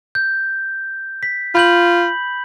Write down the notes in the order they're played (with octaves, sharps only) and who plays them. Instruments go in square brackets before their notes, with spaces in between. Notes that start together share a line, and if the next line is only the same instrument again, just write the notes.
[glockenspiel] G6
B6
[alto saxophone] F4 [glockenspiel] B5 G6 F#7